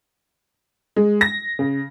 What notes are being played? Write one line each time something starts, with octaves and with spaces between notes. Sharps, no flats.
G#3
A#6
C#3